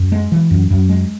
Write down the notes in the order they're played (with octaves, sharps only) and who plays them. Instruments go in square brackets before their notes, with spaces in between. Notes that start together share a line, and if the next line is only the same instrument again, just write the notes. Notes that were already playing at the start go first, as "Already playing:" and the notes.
Already playing: [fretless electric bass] F#2
G#3
E3
F#2
F#2
G#3